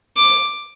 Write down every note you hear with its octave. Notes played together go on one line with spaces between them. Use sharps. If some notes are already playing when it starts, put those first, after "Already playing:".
D6